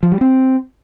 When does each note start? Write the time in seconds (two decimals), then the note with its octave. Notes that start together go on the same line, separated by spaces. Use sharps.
0.03 F3
0.12 G3
0.21 C4